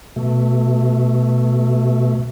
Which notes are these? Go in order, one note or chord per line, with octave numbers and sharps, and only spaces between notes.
B2 A3